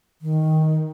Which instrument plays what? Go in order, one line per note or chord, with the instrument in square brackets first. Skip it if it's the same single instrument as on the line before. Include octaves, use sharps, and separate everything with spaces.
[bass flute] D#3